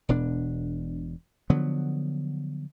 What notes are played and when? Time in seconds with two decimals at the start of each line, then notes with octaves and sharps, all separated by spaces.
0.09 E1 B2 D4
1.50 D3 F3 F#3 B3